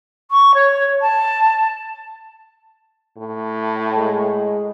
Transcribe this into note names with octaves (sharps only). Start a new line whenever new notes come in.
C#6
C#5
A5
A2
G#3